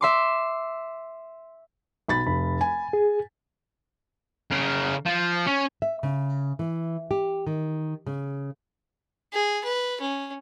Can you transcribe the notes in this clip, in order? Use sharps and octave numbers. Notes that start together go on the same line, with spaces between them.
E5 C6 D6
B1 B5 A6
F1 B5
G#5
G#4
C#3 A#4
F3
C#4
E5
C#3
E3
G4
D#3
C#3
G#4
B4
C#4